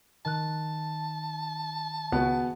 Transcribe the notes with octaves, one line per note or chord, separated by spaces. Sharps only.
D#3 A5 F#6
C#2 G#3 B3 F#4